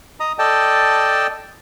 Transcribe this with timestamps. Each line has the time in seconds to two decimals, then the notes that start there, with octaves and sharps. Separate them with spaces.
0.20 D#5 A#5 D#6
0.39 A4 D5 D#5 G5 A5